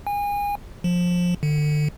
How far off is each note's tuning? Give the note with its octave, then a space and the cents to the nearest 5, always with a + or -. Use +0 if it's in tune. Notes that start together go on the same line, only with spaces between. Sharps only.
G#5 -30
F3 +20
D3 +30